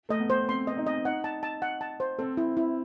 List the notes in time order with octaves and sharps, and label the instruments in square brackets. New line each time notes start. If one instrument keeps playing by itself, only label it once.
[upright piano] A3 [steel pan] D#5
[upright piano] B3
[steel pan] C5
[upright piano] C4 [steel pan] C6
[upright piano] C4 [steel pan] D#5
[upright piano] D#4
[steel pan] D#5
[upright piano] D#4 [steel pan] F#5
[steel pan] A5
A5
F#5
A5
C5
[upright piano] C4 [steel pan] A4
[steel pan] E4
E4